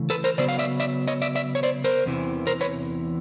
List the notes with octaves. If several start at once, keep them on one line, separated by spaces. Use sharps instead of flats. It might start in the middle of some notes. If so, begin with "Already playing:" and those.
Already playing: C#3 E3 A3
A4 B4
A#4 C5
C#3 F#3 B3 C5 D5
F5
D5 E5
D5 E5
C#5 D#5
D5 E5
D5 E5
C#5
C5 D5
A#4 C5
E2 C3 E3
A#4 C5
B4 C#5